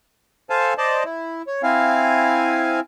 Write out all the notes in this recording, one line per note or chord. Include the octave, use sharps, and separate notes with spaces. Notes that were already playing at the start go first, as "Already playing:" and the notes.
A4 C5 F5 G#5 A5
C5 D5 D#5 A5
E4
C#5
C4 E4 F5 G#5